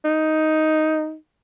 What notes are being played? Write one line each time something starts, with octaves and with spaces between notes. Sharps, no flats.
D#4